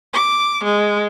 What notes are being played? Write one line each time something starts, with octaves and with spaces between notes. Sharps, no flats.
D6
G#3